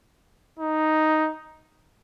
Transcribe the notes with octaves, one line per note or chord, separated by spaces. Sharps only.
D#4